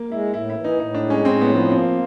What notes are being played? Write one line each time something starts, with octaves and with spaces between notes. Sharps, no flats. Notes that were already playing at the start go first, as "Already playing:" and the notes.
Already playing: A#3
G#3 E4
A2 E4
E4
E3
D#4
A2 D#4
D4
G#3
C#4
A2 C4
B3
F3
B3
A#3 C4